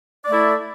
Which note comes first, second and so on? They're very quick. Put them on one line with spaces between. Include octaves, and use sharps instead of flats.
D5 A3 E4